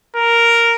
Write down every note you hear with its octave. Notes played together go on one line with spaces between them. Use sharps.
A#4